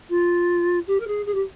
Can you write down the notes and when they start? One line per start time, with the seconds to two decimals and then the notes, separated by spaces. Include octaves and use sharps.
0.09 F4
0.87 G4
1.00 A#4
1.07 G#4
1.26 G#4
1.34 G4